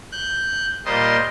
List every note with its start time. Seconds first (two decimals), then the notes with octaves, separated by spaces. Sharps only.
0.12 F#6 G6
0.85 A#2 G3 A#3 C5 D#5 C6